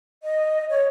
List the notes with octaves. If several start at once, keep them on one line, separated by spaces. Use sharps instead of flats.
D#5
C#5